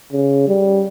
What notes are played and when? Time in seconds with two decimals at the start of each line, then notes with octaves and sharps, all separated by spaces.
0.13 C#3
0.48 G3